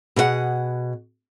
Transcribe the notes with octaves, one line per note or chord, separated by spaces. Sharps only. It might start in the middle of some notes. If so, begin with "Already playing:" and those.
B2 G#4 C5 F#5